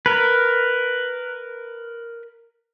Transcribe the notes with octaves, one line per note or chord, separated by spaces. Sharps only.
A#4 B4